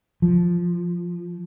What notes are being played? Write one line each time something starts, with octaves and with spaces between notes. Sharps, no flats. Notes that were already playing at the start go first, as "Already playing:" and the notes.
F3